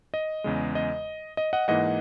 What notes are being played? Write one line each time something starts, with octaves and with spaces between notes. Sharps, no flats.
D#5
E2 C#3 G#3
D#5
D#5
D#5 F#5
G#2 E3 A#3 D#5 F#5